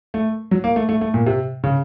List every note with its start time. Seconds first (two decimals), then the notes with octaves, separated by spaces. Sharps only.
0.14 A3
0.51 F#3
0.64 A#3
0.76 A3
0.89 A3
1.01 A3
1.14 A#2
1.26 C3
1.64 C#3